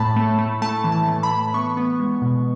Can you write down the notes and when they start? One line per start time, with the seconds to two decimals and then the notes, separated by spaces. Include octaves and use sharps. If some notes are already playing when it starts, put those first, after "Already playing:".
Already playing: A2 A3 A5 B5
0.16 A3
0.38 A3
0.62 A3 A5
0.84 E3
0.92 A5
1.08 A3
1.23 B5
1.31 E3
1.54 B3 C#6
1.77 B3
2.00 G#3
2.22 B2